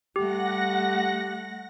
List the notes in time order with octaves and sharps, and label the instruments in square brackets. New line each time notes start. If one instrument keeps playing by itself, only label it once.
[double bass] G3 A3 [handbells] G4 [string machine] F#5 A#6